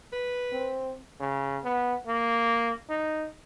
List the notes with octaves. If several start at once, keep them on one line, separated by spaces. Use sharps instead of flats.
B4
C4
C#3
B3
A#3
D#4